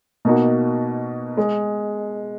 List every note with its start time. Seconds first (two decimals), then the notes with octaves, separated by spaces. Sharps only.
0.25 B2 A#3 D#4 F#4
1.37 G#3